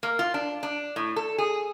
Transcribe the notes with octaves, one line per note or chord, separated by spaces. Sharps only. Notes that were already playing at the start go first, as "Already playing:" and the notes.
A#3
F4
D4
D4
A2
A4
G#4